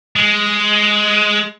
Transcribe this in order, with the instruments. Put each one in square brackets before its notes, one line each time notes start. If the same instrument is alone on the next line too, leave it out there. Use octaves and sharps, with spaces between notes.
[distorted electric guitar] G#3